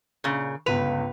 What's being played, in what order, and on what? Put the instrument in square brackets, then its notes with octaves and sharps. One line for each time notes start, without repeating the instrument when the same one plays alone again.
[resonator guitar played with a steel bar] A#2 C#3
[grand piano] G1 C#2 F7 [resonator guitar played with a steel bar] B4